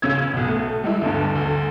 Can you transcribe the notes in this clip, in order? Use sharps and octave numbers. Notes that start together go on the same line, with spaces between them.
C#2 C#3 C#4 E6 G#6
B1 B2
A3
G3 G#3 E4
D2 G2
D2